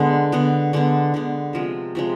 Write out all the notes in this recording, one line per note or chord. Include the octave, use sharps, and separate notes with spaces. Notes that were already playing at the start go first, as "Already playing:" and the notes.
Already playing: D3 G#3 B3
D3 G#3 B3
D3 G#3 B3
D3 G#3 B3
C3 F3 G#3
C3 F3 G#3